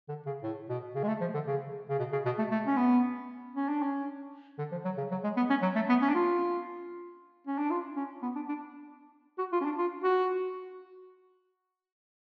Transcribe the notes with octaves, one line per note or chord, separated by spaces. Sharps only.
D3
C#3
A2
B2
C#3
G#3
A3
F3
D3
C#3
C#3
B2
C#3
B2
A3
A3
C#4
B3
C#4
D4
C#4
D3
F3
F#3
C#3
F#3
G#3
B3
C#4
F#3
A3
B3
C#4
D4
F4
C#4
D4
F4
C#4
B3
D4
D4
F#4
F4
C#4
D4
F4
F#4